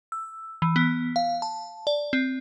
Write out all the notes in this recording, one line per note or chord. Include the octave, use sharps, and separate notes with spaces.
E6
E3
B3
F5
A5
D5
C4